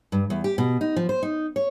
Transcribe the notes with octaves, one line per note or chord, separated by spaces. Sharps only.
G2
E2
G4
B2
D#4
F3
C5
D#4
C#5